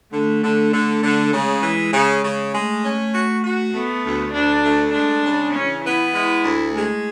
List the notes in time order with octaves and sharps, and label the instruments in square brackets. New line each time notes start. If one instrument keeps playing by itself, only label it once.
[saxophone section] D3 [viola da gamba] A3
[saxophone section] D3
D3
D3
[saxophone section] C#3 [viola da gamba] G#3
[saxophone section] E3
C#3
C#3
[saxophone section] G#3 [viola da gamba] A3
[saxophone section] C#4
F#4
F#4
[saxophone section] A3 [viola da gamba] B3
[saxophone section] D2
[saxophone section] D2 [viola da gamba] D4
[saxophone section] A3
[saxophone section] G#3 [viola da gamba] D4
[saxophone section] C#3
[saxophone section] E3 [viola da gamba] C#4
[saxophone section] B3 [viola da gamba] E4
[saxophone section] G#3 [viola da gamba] E4
[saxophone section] D2
[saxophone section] G#3 [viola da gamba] A3